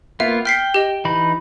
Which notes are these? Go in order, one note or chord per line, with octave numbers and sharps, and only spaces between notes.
A#3 B3 F4 E5
G5 F6 B6 C7
G4 D#5
E3 D#4 B5